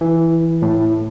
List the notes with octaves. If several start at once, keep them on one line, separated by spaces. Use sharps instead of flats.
E3
A2